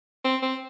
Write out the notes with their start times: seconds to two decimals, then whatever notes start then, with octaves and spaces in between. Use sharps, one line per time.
0.25 C4
0.42 C4